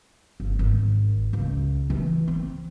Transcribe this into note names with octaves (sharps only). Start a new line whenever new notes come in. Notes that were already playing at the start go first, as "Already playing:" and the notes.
G1
G#1
C#2
E3
C4